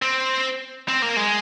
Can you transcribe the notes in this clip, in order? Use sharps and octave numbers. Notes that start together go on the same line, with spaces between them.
C4
C4
A#3
G#3